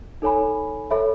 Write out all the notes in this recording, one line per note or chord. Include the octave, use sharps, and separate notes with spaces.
D#4 A4 C#5 G#5 B5
A4 C#5 E5 B5